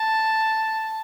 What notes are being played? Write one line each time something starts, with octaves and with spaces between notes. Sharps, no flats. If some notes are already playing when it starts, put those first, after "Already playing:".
Already playing: A5